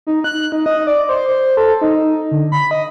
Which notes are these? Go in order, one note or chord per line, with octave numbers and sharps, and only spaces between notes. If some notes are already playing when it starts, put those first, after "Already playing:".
D#4
F#6
D#4
D#5
D5
C5
C5
A4
D#4
D3
B5
D#5